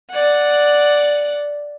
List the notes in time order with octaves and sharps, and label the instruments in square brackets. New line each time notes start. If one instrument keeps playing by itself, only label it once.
[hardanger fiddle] D5 F#5